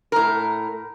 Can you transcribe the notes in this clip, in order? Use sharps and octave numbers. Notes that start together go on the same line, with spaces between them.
A2 A#4